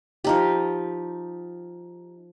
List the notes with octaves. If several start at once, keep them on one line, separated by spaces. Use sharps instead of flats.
F3 D#4 G4